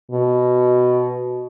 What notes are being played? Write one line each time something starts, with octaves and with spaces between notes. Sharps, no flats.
B2